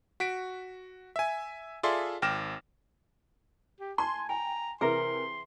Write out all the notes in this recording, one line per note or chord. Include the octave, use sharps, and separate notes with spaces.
F#4 B6 D7
E5 G#5
F4 G#4 A4 D5 E5 C6
G#1 G5 D6 F6 A#6 E7
G4
G#5 A5 C6
G5 G#5 A#5
C3 E3 G#4 A#4 B4 E5 C6